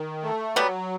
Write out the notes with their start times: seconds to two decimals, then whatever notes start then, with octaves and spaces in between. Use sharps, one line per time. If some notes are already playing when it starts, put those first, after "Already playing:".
Already playing: D#3
0.23 A3
0.56 F#3 G3 B3